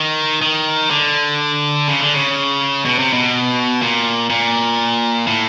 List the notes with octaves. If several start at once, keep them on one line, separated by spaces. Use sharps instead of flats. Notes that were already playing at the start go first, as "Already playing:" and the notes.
Already playing: D#3
D#3
D3
C#3
D3
C#3
B2
C3
B2
A#2
A#2
A2